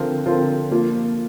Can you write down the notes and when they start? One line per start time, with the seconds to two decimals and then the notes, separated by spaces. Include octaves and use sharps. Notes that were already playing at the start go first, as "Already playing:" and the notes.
Already playing: D3 F3 C4 F4 A#4
0.26 D3 F3 C4 F4 A#4
0.71 F3 A#3 F4